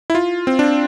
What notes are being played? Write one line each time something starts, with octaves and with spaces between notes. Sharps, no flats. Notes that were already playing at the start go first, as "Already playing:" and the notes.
E4
F4
C4
D4